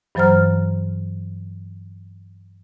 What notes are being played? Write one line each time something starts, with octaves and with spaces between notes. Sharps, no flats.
G2 E3 F#3 C5 A#5 F6